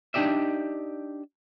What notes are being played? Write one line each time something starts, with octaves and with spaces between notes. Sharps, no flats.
D4 D#4 G4 D5 E5